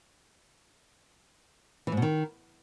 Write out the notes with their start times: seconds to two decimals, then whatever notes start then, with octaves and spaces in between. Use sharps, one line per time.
1.87 E3
1.92 G#2
1.97 B2
2.02 D#3